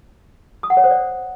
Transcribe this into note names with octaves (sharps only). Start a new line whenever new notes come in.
D#6
F#5
C#5
C5
D5